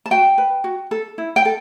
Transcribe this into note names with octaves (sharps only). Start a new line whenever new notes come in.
A5
F#4 G5
B4
F#4
A4
E4
G5
A4